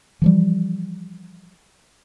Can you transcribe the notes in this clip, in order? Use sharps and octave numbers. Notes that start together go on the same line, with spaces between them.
E3 F3 G3